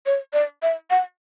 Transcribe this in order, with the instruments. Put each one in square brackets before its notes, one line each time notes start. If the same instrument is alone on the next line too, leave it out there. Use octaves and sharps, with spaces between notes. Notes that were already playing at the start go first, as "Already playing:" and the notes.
[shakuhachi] C#5
D5
E5
F#5